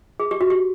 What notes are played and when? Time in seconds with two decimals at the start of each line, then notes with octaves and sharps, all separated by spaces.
0.20 G#4
0.31 G4
0.41 F#4
0.50 G4